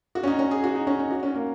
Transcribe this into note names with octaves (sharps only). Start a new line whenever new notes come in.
F#4
C#4
D#4
C#4
G#4
F#4
D#4
C#4
D#4
F#4
C#4
A#3